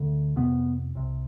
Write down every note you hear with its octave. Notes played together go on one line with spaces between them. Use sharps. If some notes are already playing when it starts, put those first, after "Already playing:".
Already playing: D2 D3
F2 C3 B3
C2 C3